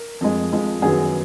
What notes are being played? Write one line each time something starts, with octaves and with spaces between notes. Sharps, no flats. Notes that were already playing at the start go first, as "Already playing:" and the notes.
Already playing: A#4
F2 F3 G#3
F2 F3 G#3
F#2 D#3 F#3 B3 G#4